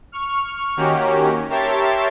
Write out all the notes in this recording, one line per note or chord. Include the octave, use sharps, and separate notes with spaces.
C#6 F6
D#3 A#3 C#4 F#4 G4
G4 A#4 C#5 E5 A5 C6